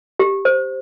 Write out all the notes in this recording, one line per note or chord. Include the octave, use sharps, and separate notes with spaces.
G4
C5